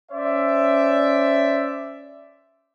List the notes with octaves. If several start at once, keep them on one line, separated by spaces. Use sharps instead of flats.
C#4 C5 D5 E5